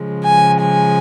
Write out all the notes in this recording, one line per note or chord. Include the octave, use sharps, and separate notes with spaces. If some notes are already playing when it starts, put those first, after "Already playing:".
Already playing: C#3 F3 G#3
G#5
G#5